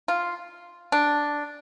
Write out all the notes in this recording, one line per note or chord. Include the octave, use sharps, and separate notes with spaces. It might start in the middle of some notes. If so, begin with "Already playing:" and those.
F4
D4